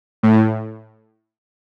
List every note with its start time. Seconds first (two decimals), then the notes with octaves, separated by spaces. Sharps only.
0.23 A2